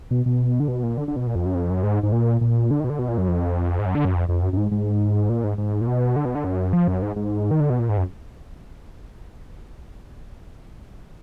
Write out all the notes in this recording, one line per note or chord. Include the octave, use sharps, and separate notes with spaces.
B2
B2
D3
B2
A#2
D3
D3
B2
A#2
F2
F#2
F2
F#2
G#2
G#2
A#2
A#2
D3
D#3
B2
D3
B2
A#2
F#2
F2
G#2
F#2
D3
F#2
F2
F2
F#2
F#2
G#2
G#2
A#2
G#2
G#2
A#2
B2
D3
B2
D3
F#2
F3
F#2
G#2
G#2
D#3
D3
B2
A#2
G#2
F#2